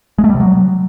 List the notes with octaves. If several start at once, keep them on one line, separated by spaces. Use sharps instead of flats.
G#3
A3
G3
C3
F#3